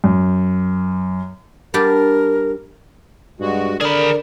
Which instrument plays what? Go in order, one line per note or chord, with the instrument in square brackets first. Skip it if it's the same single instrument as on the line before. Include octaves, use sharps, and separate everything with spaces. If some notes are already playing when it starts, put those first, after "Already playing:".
[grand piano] F#2
[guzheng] G3 D4 G4 [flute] A#4
[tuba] G2 [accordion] G#3 F#4
[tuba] D3 [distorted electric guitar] G#4 B5 [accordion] A#4 [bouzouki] D5